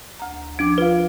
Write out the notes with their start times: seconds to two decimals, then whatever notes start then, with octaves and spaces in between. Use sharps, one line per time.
0.20 D2 A#5
0.59 F3 D4 D6 D7
0.78 F4 B4 F5